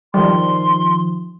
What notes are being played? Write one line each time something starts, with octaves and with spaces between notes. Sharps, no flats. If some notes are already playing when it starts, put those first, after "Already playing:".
D#3 F3 G3 C6